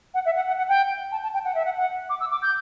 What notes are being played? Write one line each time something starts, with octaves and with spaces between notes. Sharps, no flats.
F#5
E5
F#5
F#5
F#5
G5
A5
A5
G5
F#5
E5
F#5
F#5
D6
E6
D6
G6